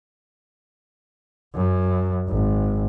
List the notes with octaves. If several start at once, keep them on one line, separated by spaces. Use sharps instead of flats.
F#2
G#1